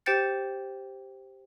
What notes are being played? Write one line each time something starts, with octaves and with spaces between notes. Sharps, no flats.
G4 C5 G5 G6 A6 C#7